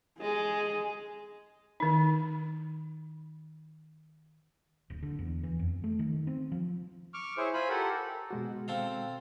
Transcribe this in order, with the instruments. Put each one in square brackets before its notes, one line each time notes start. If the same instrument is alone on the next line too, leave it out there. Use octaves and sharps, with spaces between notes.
[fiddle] G#3 [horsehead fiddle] G#4
[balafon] D#3 D#4
[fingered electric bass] D1
D3
E2
E3
F2
A3
D#3
C4
F3
[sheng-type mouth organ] C#6 D6 F6
E4 G#4 C5 C#5
F4 C5 G#5 B5
G4 A4 A#4 F#5
[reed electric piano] B2 G#3 F#4
[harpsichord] C4 A4 F5